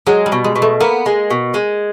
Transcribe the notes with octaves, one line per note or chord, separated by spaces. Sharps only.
F#3 G#3
G3
B2
G#3
B2
A3
A#3 B3
G#3
B2
G#3